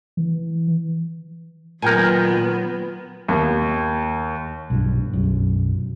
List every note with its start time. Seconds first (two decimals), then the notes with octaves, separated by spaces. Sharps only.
0.17 E3
1.82 A#2 D#3 F#3 B3 A#4 G5 G#5
3.29 D#2
4.70 B1 G2
5.13 B1 F#2